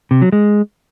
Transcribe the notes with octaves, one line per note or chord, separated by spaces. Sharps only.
C3
F#3
G#3